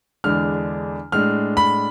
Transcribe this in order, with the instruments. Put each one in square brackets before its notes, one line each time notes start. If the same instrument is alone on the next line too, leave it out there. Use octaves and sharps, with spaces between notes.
[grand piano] E2 D3 G#3 D4 F6
A2 G#3 D4 F6
B5